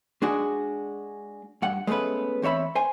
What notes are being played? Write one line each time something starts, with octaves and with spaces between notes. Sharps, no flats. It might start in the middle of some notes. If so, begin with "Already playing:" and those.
G#3 D4 F#4 G#4
G2 F#5
G#3 A3 B3 C#4 B4
E2 C4 C#5 E5 B5
C5 G#5